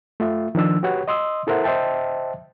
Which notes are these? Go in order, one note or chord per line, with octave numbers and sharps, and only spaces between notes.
A3 F4 E5
D#3 F3 D4 E6
F#4 G4 B4 C#5 F#5
D#5 C6 D#6 E6
E4 A4 A#4 C5 E5 F#5
C5 D#5 E5 G5 A5